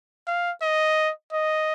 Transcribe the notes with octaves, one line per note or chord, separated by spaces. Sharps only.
F5
D#5
D#5